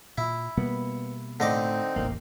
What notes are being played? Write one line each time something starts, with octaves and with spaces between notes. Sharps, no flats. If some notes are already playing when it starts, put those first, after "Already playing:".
A#2 E4
B2 G3 A#3 B3
A2 D3 C4 D#4 D#5 D6
D#1 A1 E2 A#3